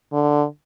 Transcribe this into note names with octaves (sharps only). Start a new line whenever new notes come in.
D3